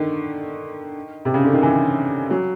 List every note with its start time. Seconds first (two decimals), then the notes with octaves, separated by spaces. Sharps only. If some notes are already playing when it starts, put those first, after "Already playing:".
Already playing: D3 D#3
1.25 C3
1.34 C#3
1.44 D3
1.53 D#3
1.63 E3
2.30 F#3